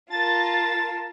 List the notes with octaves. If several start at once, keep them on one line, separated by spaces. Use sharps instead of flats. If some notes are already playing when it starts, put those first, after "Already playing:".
F4 A#4 A5 A6